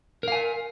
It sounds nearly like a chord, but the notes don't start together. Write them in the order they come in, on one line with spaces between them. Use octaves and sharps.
A#4 F5 G#5